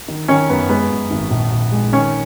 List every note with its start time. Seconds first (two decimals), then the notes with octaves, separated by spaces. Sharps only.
0.08 D#3
0.28 D#3 C#4
0.49 F#2 B3
0.69 G#3 B3
0.90 F#2
1.10 G#1
1.31 A#1
1.51 A#1
1.72 G#3
1.92 D#3 C#4